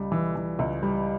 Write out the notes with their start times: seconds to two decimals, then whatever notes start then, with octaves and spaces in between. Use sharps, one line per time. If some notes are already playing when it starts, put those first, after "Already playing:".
Already playing: C#2 G3
0.12 E3
0.35 E3
0.59 C#2
0.83 G3